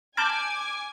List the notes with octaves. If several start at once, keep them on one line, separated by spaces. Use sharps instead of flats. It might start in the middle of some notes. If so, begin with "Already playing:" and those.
G#5 A5 D6 F6 G6 E7 F#7